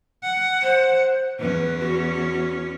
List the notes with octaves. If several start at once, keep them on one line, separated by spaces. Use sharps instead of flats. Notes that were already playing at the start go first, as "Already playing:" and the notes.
F#5
C5
E2 C#4 B4
F#4